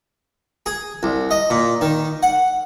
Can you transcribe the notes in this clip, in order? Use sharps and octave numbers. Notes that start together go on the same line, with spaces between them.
G#4
C2
D#5
A#2
D#3
F#5